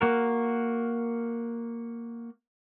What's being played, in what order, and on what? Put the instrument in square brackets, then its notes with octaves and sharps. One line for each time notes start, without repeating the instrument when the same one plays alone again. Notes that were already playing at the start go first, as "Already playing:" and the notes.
[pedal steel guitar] A#3 F#4 A#4